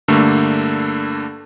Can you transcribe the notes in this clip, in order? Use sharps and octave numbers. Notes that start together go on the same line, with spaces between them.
G2 D3 A3 A#3